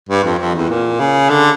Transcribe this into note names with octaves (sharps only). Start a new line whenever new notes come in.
G2
F2
F2
E2
A#2
C#3
D3